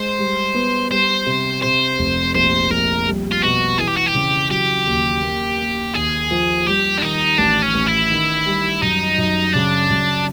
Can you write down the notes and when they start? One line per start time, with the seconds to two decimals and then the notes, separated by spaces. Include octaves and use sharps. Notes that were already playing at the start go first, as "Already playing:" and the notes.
Already playing: G#3 C5
0.18 G3
0.54 B3
0.91 G3 C5
1.26 C3
1.63 C3 C5
1.99 F1
2.35 A#1 C5
2.71 A#1 A#4
3.07 G3
3.32 F4
3.43 B2 F#4
3.78 E3 G#4
3.88 G4
3.97 F#4
4.06 G4
4.14 C#3
4.50 F#3 G4
4.87 D#2
5.22 A#3
5.58 A#3
5.94 D#2 G#4
6.31 F3
6.67 G3 G4
6.98 D4
7.02 D#3 D#4
7.38 A1 D4
7.62 C#4
7.74 A1
7.87 E4
8.11 D#3
8.46 G3
8.82 F#2 D#4
9.18 F#2
9.54 C#3 D4
9.90 F#2